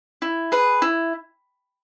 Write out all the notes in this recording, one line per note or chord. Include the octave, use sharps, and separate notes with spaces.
E4
G#4 B4
E4